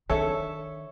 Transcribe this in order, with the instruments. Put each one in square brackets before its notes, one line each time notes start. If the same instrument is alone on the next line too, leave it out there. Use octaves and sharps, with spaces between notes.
[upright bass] D#3 D4 [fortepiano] A4 [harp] C#5 E5